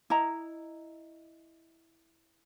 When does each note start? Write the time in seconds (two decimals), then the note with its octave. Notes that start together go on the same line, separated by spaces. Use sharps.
0.10 E4 D#5 A#5